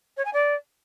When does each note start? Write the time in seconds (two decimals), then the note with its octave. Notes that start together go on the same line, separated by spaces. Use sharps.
0.17 C#5
0.25 G#5
0.33 D5